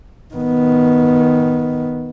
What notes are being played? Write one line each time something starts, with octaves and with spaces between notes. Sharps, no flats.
D#3 B3